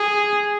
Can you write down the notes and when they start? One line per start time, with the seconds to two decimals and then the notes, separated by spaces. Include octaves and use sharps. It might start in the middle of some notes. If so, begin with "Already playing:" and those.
Already playing: G#4